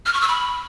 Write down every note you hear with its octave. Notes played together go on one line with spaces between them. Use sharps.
F6
C#6
E6
B5